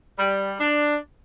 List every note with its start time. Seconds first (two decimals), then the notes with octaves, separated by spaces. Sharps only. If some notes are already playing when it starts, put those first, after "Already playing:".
0.18 G3
0.59 D4